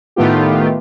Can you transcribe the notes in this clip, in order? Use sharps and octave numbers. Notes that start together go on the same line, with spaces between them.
A2 D#3 A3 B3 F4 G4